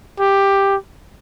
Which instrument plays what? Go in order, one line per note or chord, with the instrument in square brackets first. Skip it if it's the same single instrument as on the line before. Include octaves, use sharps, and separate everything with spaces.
[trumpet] G4